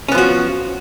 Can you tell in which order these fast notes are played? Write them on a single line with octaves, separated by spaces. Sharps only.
C#4 B3 F3 F#4